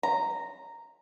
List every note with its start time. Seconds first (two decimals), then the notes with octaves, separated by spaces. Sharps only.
0.03 A#5